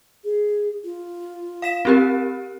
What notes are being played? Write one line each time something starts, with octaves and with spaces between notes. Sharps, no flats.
G#4
F4
F5 B6 E7
C4 G4 A#4